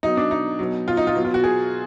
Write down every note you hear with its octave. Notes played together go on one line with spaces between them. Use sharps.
B2 F#3 D#4
D4
D#4
B2 F#3
F4
D#4
F4
B2 F#3
F4
F#4
G#4